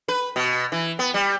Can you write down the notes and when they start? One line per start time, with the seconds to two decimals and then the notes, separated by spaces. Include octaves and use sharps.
0.08 B4
0.36 B2
0.72 E3
0.99 B3
1.14 G3